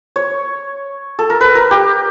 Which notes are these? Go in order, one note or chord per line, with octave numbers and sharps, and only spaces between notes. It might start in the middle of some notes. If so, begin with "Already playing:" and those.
C#5
A4
A#4
B4
A#4
G4